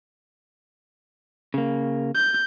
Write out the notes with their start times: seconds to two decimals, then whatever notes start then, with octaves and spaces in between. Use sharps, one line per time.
1.54 C#3 A#3
2.15 G6